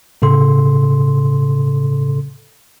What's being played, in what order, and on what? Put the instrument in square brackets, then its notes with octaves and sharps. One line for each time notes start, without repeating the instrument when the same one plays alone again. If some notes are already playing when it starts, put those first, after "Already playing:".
[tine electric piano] A2 C#3 A4 C6